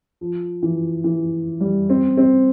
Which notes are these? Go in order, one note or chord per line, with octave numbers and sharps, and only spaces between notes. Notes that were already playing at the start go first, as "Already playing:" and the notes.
F3
E3
E3
G3
C4
C4